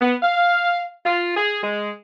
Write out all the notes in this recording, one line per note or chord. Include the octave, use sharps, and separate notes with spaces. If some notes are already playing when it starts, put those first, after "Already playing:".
B3
F5
F4
G#4
G#3